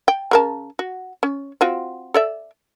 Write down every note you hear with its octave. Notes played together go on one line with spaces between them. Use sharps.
G5
C#3 A#4 A5
F#4
C#4
C4 F4 F#4
A4 D5 E5